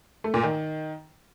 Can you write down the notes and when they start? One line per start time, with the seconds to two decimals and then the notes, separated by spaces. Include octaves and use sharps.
0.24 A3
0.34 A#2
0.43 D#3